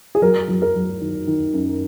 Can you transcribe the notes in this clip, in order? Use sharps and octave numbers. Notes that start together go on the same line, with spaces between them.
G#4
F#3 A#4
F#3
A#4
F#3
D#3
D#3
F#2